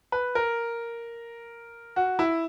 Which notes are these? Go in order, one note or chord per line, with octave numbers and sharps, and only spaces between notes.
B4
A#4
F#4
E4